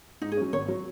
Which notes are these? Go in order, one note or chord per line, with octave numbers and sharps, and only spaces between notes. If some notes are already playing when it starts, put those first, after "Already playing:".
G#2 D#4
G#4
F#3 C#4
G#1 C#5
F#3